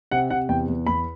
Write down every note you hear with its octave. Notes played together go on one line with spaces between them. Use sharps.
C3 F#5
C3 F#5
E2 G5
E2
E2 B5